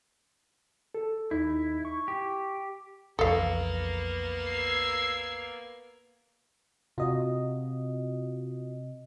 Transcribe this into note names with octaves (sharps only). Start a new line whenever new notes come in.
A4
D#2 D#4 E4
C#6
G4
B1 F2 E3 A#3 B3 A4 F5
E6 G#6 C7
C3 F4 F#4 D#5